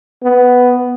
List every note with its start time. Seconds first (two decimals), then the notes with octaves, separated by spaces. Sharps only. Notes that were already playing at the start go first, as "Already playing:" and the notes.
0.23 B3